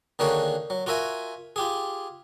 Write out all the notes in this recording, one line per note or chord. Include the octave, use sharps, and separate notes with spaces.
D3 D#3 A#3 F#4 G#4 C#5
F#3
F4 F#4 A#4 E5 G#5
F4 G4 G#4